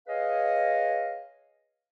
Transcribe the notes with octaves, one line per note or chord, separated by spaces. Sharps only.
G#4 B4 C#5 D#5 F5